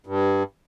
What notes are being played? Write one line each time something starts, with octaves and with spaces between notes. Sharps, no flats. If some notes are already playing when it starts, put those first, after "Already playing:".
G2